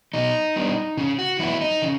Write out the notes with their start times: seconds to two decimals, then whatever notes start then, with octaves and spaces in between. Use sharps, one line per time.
0.14 B2 D#4
0.56 G3 B3 D4
0.97 C#3
1.19 F#4
1.39 F#3 B3 E4
1.61 D#4
1.82 C#3